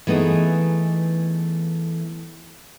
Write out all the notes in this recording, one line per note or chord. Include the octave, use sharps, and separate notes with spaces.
E3 A3 B3 D#4 G#4